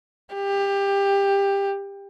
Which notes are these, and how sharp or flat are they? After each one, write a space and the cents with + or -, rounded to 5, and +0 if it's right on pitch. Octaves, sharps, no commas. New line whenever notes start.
G4 +20